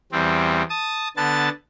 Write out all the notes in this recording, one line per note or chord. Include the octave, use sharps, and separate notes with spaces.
E2 G3 C4
A5 D#6
D3 B3 A5 A6